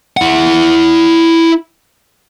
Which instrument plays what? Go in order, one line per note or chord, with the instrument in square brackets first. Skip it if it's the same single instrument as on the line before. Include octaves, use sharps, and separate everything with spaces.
[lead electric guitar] E4 F#5